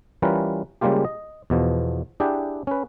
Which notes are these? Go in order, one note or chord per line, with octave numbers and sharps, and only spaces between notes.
E3 G3 C#4 F4 A#4 B4
C#3 G3 G#3 A#3 F4 G4
D#5
E2 B2 F3
D4 E4 G4 G#4 F#5 G5
C#4 B4